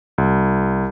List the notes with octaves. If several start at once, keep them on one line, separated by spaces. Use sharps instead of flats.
C2